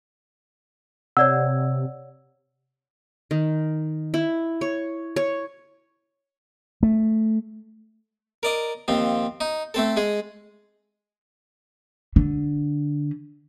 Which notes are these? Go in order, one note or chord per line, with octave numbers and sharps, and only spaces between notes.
C3 C#5 D5 F#5 E6
D#3
E4
C#5
C#5
A3
A#4 D5 D#5
D#2 F3 C4
D#4
A3 C4 A4
G#3 G#4
D3